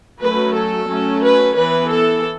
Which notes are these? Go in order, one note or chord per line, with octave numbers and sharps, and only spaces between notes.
F#3 A3 C#4 B4
A4
F#3 A3 C#4
B4
E3 B3 B4
A4